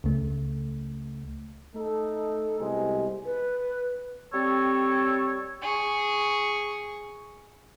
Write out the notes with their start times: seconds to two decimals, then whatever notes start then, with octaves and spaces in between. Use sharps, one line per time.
0.04 C#2 C#3 A3
1.75 A3 D#4 A4
2.59 C2 B2 G#3 G4 G#5
3.26 B4
4.33 G3 C4 A4 C#5
5.62 G#4 C#6